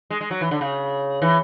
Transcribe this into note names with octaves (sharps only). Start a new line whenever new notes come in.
G#3
G#3
F#3
E3
D3
C#3
E3